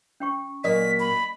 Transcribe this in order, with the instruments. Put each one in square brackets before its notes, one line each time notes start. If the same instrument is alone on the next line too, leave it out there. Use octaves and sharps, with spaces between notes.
[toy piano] C#4 G5 C#6
[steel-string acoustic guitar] A#2 F#3 A#3 [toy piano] D5 D#5 D#6 [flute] B6
[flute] B5